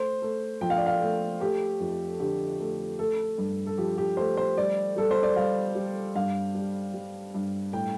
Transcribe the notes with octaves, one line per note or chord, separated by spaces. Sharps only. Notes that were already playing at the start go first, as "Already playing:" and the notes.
Already playing: A3 C5
A3
F3 G5
F5
D5
F5
A3
A3 G4
F2
D3 G4
A3
A3 A4
G2
A4
F3 G4
G4
A3 C5
C5
G3 D5
G3 A4
C5
D5
G3 F5
G3
G2 F5
G3
G3
G2
A2 G5